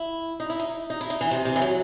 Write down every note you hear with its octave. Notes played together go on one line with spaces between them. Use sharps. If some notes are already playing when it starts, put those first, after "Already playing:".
Already playing: E4
D#4
E4
D#4
D#4
E4
D#4
E3
C3
C3
E3
F#3